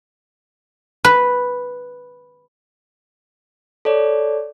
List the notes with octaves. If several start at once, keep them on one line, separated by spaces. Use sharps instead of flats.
B4
A4 C#5 D5